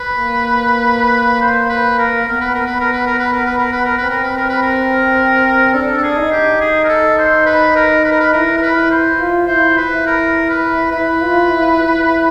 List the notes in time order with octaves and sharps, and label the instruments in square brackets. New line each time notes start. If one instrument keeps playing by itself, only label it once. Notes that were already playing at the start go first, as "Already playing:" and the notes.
Already playing: [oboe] B4
[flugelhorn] A#3
[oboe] C5
B4
A#4
[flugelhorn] B3 [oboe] A#4
[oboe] B4
A#4
B4
A#4
B4
A#4
B4
A#4
B4
A#4
B4
A#4
[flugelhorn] C4 [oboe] B4
[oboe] A#4
B4
A#4
B4
A#4
[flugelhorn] D4 [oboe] A4
[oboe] A4
G#4
[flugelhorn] D#4
[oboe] G4
G#4
A#4
A4
C5
B4
A#4
B4
A#4
B4
[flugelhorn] E4 [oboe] A#4
[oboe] A#4
B4
[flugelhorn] E4
[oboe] C5
[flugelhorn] F4
[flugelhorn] E4 [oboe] C5
[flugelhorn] E4 [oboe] B4
[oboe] A#4
B4
[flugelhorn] E4 [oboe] B4
[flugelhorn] F4
E4
E4